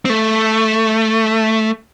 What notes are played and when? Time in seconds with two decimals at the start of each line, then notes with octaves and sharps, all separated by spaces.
0.05 C4
0.10 A3